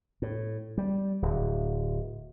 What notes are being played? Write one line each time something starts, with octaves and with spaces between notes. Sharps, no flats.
A2
G3
D1